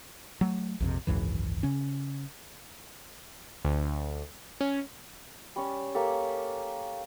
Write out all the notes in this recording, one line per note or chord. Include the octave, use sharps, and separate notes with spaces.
F#3 A3
A#1 F2 C3
G#1 C#2 F#2 E3
C#3 C#4
D2
C#4
G3 C#4 C#6
A#3 C#4 G4 A4